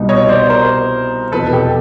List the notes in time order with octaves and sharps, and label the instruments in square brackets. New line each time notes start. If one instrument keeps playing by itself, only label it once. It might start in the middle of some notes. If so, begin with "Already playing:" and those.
Already playing: [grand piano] C2 B2 G3 B3 D#4
[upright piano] C#5 D#5
C5 D5
A#4 C5
[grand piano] F1 E2 B2 [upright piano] A4 B4
[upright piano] G4 A4